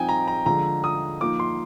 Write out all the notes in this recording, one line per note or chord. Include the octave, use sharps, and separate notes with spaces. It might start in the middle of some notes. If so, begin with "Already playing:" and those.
Already playing: F3 C4 D#4 G5 G#5
A#5
A#5
D3 F3 G#3 A#5
D#6
F3 A#3 D#4 D6
C6